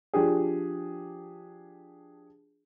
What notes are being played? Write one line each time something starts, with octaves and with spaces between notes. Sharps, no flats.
F3 D4 G4 G#4